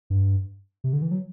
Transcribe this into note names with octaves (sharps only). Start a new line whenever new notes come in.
G2
C3
D3
E3
F#3